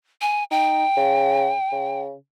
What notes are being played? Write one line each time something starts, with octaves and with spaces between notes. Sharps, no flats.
G#5
D#4 G5
C#3
C#3